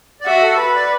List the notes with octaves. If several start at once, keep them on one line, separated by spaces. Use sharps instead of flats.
D5
F#4 E5
A4
B4
D5